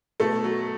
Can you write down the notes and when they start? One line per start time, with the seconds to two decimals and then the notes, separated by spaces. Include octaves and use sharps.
0.20 B2 A3 A4
0.44 F#3